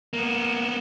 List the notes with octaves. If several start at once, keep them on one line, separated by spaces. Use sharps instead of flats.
A#3 B3